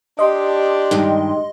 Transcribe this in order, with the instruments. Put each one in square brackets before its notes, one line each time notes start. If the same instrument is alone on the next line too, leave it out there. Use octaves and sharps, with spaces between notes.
[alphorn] D4 [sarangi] G4 [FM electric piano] D#5 C6
[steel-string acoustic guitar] G2 D#3 G#3